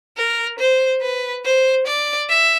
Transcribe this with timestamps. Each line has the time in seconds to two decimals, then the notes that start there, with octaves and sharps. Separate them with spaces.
0.17 A#4
0.59 C5
1.01 B4
1.45 C5
1.87 D5
2.29 E5